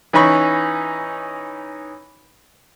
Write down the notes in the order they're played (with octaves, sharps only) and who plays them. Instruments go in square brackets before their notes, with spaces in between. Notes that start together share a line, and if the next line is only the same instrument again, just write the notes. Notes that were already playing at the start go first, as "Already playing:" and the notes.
[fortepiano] E3 C#4 D#4 B5 C#6